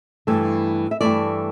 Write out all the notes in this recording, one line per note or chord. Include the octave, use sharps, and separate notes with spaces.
G2 E3 A3
E5
G2 E3 A3 D5